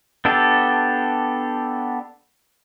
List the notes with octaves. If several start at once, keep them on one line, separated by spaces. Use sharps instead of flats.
B3 D4 G4 A4